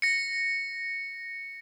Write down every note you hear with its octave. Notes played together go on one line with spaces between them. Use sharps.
A#6 C#7